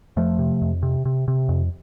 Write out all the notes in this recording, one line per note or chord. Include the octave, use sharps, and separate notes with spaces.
F2 F3 A3
C3
F2
C3
C3
C3
F2